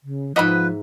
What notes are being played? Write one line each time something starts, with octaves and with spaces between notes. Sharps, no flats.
C#3
G#2 F3 B4 D#5 E5 F#5 B5